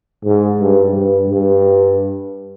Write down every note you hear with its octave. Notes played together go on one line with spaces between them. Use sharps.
G#2
G2
G2
G2